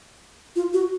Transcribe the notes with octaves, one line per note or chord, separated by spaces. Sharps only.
F4
F#4